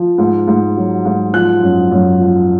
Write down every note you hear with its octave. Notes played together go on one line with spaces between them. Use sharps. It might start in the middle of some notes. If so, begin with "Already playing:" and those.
Already playing: F3
G#2
G#2
F#3
G#2
F3 F#6
F#2
F#2
F3